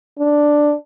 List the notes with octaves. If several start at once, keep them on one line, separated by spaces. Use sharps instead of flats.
D4